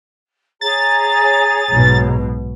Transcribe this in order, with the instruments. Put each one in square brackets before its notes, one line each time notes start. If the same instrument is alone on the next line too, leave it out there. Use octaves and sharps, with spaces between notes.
[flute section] G#4 C#5 A#5 [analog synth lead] A6
[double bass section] B1 G#2 B2